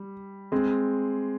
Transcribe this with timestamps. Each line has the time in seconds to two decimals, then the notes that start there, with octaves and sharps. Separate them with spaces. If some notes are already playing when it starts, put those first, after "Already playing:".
Already playing: G3
0.52 G#3 C4